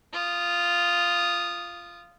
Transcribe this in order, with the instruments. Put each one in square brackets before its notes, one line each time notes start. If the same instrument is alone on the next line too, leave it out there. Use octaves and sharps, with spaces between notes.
[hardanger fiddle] F4 D#6